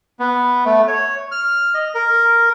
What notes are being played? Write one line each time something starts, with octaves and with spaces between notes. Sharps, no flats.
B3
A3
C#5
F6
D#5
A#4